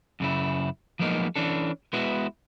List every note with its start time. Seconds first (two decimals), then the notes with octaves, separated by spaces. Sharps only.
0.20 F#2 C#3 E4
0.99 F3 F#3 G#3 A#3 B3 D#4
1.36 E3 C#4 D4 A4
1.93 G#3 B3 E4 F#4 B4